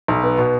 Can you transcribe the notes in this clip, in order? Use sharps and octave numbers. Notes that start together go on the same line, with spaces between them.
B1
B3
B2